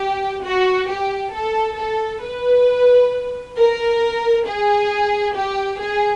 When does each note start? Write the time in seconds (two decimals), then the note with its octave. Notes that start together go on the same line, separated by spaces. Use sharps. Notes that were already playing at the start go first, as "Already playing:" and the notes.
Already playing: G4
0.44 F#4
0.89 G4
1.34 A4
1.78 A4
2.23 B4
3.57 A#4
4.47 G#4
5.37 G4
5.81 G#4